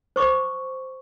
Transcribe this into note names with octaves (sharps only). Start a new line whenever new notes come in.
C5 C#6 D6